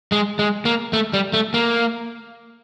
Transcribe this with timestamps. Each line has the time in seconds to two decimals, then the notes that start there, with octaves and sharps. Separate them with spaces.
0.12 G#3
0.39 G#3
0.65 A#3
0.93 A3
1.14 G3
1.33 A3
1.54 A#3